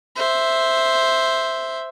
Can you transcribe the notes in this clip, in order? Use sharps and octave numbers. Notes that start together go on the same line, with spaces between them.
C5 E5